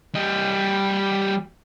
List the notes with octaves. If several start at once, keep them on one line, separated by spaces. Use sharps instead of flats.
G3 D#5